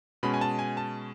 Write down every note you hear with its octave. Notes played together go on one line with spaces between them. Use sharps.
B2 G#3 C#4 B5
G#5
A5
G#5
A5